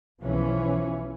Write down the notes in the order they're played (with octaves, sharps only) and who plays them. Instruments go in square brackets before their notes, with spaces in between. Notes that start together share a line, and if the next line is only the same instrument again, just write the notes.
[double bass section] B1 B2 E3 F3 C#4